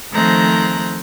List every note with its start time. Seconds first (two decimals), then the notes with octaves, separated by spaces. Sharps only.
0.13 D#3 F3 A3 C4 A#5 F#6